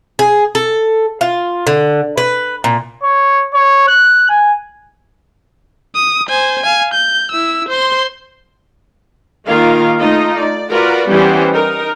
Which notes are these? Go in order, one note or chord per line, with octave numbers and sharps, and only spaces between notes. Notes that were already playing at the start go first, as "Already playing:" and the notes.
G#4
A4
F4
D3
B4
A#2
C#5
C#5
F#6
G#5
D#6
C5 G#5
F5 G#5
G6
E4 E6
C5 C6
D#3 A#3 F4 A#4 F5
A3 D#4 F4 D#5
D5
F4 F#4 A#4 B4 D5
E3 G3 B3 C#4 G4 C5
D#4 A#4